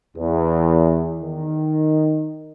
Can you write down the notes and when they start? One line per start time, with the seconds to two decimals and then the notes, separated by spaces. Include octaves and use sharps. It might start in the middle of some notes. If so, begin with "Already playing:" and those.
0.17 E2
1.21 D#3